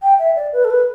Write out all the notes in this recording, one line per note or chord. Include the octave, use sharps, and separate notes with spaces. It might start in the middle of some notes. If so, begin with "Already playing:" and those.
G5
E5
D5
B4
A4
B4